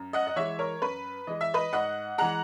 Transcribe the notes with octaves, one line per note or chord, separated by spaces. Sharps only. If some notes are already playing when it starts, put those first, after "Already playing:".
Already playing: F#2
D#5 F#5
D#5
E3 G#3 C#5 E5
A#4 C#5
F#2 B4
E3 G#3 D#5
E5
B4 D#5
G#2 D#5 F#5
E3 G#3 F#5 A#5